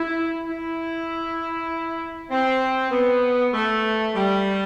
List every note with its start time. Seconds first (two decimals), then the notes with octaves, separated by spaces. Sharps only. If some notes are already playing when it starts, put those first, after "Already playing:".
Already playing: E4
0.48 E4
2.31 C4
2.91 B3
3.53 A3
4.14 G3